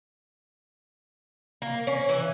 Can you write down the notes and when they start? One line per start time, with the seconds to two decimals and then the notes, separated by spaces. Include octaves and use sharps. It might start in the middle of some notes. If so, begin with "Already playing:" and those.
1.62 A#3
1.87 C#4
2.09 E3